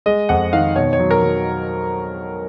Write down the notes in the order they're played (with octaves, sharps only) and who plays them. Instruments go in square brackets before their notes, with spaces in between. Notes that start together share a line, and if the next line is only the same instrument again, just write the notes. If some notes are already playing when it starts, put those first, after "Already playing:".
[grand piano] G#3 D#5
F2 F#5
D#3 F5
B2 C#5
C#5
F#3
A#4
F#3